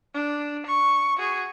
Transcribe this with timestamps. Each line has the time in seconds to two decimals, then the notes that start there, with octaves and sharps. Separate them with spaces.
0.14 D4
0.66 C#6
1.18 F#4 G#4